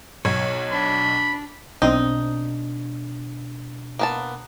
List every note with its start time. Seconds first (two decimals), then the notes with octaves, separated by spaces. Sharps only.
0.25 B1 C#5
0.72 D4 B5
1.82 B1 B2 C4 D4 D#4 D#6
3.99 A#3 B3 A5